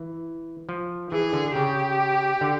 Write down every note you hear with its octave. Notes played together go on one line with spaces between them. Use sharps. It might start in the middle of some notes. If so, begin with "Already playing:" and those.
Already playing: E3
F3
E3 G#4
D3
C#3 G4
D3